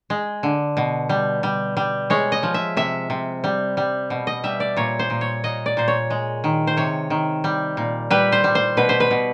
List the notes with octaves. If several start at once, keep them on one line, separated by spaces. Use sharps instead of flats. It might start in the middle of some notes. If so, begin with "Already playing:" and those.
G#3
D3
B2
G3
G3
G3
G#3 C#5
D#5
F3
E5
C3 E5
C3
G3
G3
B2
D#5
G3 E5
D5
A#2 C#5
C5
A#2
C#5
A#2 D#5
D5
A#2 C5
C#5
G#3
D#3
C5
C3 C#5
D#3
G3
A#2
G3 B4
C5
G3
C5
B2 B4
C5
B4
B2